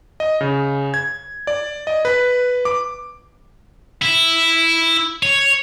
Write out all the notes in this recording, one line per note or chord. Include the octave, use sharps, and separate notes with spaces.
D#5
C#3
G#6
D5
D#5
B4
D6
E4
C#5